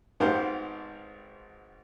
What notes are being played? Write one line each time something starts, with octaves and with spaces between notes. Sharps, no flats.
G#1 G#2 B3 G4 C5 F5